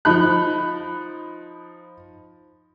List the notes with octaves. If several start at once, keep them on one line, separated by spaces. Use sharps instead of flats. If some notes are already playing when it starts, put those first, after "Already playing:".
F3 D#4 B5 F#6